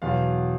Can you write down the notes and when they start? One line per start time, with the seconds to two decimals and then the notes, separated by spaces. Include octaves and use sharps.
0.02 E2 B2 F#3 F5